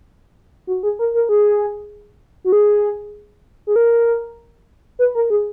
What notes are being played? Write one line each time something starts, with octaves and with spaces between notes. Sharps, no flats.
F#4
G#4
A#4
A#4
G#4
F#4
G#4
G#4
A#4
B4
A#4
G#4